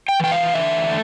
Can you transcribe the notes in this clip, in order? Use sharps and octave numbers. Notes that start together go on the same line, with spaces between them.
G5
E3 G5
F5
D3 E5
A3